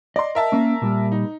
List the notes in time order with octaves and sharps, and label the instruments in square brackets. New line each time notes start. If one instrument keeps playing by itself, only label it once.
[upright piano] D5 C6 [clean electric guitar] D#5
[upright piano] A#4 E5 A5
[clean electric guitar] A#3 C#4
A#2 G3
[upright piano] D#4